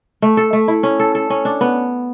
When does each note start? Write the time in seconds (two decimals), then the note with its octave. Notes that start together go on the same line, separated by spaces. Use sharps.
0.22 A3
0.37 A4
0.53 A3
0.68 E4
0.83 C#4
0.99 A4
1.15 A4
1.30 C#4
1.45 D4
1.61 B3